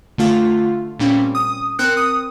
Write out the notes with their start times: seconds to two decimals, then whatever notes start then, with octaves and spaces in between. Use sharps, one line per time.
0.18 D3 A3 F4
0.99 A#2 G3 C4 C#4
1.35 D#6
1.79 C4 A#4 F#6 C#7
1.97 D#6